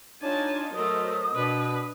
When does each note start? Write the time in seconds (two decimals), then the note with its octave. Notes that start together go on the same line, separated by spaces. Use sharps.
0.22 D4 D#4 F4 C#5 G#5 A5
0.75 F#3 A3 A#4 C5 D#5 D#6
1.35 B2 D4 B4